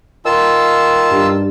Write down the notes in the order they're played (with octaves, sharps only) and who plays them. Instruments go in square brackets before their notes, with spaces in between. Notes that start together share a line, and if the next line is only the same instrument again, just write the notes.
[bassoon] D#3 [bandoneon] F4 A5 E6
[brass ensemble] G2